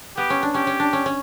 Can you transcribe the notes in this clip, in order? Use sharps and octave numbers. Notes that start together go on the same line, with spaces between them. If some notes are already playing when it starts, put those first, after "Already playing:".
B3 G4
C#4
D4
C#4 G4
C#4
D4
C#4
C#4